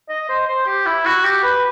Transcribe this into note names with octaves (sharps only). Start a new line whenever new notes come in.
D#5
C5
C5
G4
E4
F#4
G4
B4